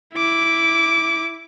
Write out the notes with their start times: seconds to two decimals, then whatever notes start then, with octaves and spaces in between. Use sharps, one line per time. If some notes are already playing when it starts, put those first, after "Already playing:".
0.15 E4 D6